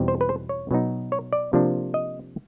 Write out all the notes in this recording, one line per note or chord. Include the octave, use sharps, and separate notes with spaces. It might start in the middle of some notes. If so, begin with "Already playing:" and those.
Already playing: E2 B2 G3 C4 D#4
C5
B4
C5
C#5
B2 F#3 B3 D#4
C#5
D5
C3 F3 A#3 D4
D#5